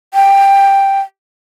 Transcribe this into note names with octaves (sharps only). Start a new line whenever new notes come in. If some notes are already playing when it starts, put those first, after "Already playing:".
G5